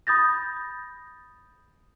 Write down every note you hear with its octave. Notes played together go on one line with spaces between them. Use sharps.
B5 D#6 G6 A6 A#6